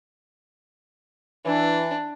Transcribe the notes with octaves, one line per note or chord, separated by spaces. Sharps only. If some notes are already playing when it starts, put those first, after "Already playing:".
E3 D4